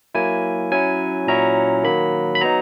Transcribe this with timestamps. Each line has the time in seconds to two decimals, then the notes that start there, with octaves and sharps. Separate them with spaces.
0.15 F#3 A#3 E4 G#5
0.72 F#3 C#4 E4 G#5
1.27 A#2 F#3 C#4 E4 A#5
1.84 D#3 F#3 A#3 B5
2.35 B5
2.41 F#3 B3 D#4 A#5